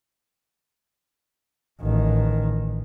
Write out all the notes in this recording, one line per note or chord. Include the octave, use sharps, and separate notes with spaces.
A1 D#3